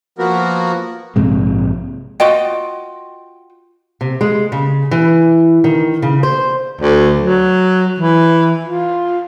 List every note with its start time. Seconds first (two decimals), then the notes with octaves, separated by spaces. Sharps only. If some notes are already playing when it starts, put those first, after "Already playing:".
0.19 F3 A#3 B3 F#4 A#4
1.16 A#1 G#2 C3 G#3
2.20 F4 F#4 D#5 G5
4.01 C3
4.21 G#3
4.52 C#3
4.91 E3
5.64 D#3
6.02 C#3
6.23 C5
6.81 D2
7.21 F#3
8.00 E3
8.65 F4